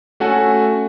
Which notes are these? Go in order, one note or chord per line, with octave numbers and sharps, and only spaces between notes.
A3 C#4 F#4 A4 F#5 G#5